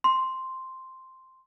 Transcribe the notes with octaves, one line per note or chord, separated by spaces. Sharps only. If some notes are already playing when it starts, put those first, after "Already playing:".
C6